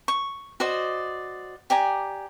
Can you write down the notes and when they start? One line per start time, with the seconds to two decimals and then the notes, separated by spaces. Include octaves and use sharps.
0.08 C#6
0.60 F#4 C5 D5 D#5
1.70 G4 D5 G#5 A#5